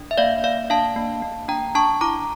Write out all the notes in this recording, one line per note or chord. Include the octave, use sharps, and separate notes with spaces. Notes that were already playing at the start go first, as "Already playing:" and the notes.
Already playing: D4
E5
A#3 D5 F5
A#3 D5 F5
D4 F5 A5
A#3
A#3
D4 G5 A#5
D4 A5 C#6
E4 A#5 D6